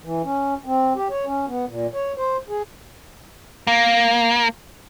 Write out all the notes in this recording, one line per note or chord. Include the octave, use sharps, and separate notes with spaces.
E3
C#4
C4
G4
C#5
C#4
B3
A#2
C#5
C5
G#4
A#3